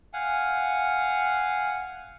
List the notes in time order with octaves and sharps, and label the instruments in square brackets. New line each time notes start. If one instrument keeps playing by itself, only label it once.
[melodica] F5 F#5 G#5